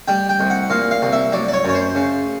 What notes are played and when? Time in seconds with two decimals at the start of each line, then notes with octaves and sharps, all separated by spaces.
0.08 G3 G5
0.29 G5
0.40 C2
0.50 F#5
0.70 A#2 F5
0.91 F5
1.02 C2
1.12 E5
1.32 F#3 D5
1.48 D5
1.53 C#5
1.65 F#2 C#5
1.74 C5
1.95 C#3